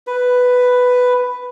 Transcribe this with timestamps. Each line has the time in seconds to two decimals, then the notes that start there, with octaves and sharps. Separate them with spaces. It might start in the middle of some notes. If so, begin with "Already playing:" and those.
0.07 B4